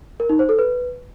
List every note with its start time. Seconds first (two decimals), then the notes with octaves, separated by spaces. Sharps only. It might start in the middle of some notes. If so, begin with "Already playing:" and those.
0.20 A#4
0.29 D#4
0.39 C5
0.49 A4
0.59 B4